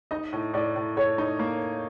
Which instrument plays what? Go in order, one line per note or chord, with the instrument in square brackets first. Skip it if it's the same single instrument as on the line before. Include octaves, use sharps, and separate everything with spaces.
[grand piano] D#4 [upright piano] D#5
[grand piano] A2
[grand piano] A2 [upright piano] D5
[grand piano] A2
[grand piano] A2 [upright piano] C#5
[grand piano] D#4
A#3